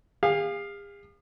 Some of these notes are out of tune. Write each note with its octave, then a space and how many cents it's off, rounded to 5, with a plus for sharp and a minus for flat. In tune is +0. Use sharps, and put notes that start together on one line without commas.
G#4 -45 F5 +5